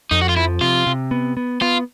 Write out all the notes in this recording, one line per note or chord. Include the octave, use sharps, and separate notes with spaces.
F2 D#4
F#4
F4
F3 E4
C3 F4
C3
B3
B3
B3 F4